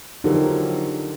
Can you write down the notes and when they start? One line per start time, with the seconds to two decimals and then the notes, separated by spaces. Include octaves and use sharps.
0.24 D3 F3 F#3 D#4 G4 A#4